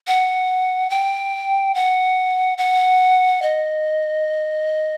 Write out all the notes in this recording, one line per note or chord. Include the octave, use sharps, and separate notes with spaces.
F#5
G5
F#5
F#5
D#5